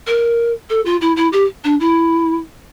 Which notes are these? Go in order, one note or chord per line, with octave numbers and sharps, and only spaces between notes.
A#4
A4
F4
E4
E4
G4
D4
E4